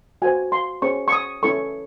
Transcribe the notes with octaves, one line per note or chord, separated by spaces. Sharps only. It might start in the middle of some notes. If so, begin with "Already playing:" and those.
F#4 C5 G#5
C6
C#4 G#4 C5 C#6
C#6
D#6
C#4 E4 A4 C#6